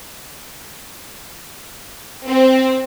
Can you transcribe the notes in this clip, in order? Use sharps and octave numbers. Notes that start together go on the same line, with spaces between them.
C4